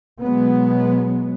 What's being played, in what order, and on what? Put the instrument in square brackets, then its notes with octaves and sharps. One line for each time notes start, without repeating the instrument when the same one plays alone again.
[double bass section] B2 F#3 G#3 B3